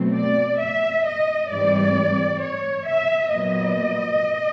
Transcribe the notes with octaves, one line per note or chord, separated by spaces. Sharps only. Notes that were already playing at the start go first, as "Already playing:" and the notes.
Already playing: B2 F#3 A3 C4
D5
E5
D#5
G#2 E3 G3 C4 D5
C#5
E5
A#2 F#3 B3 D#5